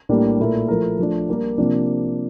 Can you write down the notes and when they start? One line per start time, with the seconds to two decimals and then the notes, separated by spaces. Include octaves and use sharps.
0.09 A2 G3 A#3 D4
0.39 A#2 A3 E4 A#4
0.68 F3 A3 E4 A#4
0.99 F3 A3 D4
1.29 G3 A#3 D4 G4 A#4
1.58 C3 F3 A#3 D4